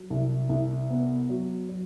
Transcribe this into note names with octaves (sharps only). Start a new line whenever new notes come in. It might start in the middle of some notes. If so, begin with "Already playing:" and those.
Already playing: F#3
C2
C2
B3
F#3
F#3